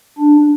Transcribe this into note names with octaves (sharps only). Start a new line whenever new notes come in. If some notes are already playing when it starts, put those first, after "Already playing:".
D4